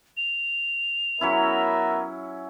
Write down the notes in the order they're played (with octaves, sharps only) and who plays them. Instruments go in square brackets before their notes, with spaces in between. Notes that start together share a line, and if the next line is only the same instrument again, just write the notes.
[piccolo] F7
[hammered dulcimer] F#3 C#4 E4 [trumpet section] B3 A#4 E5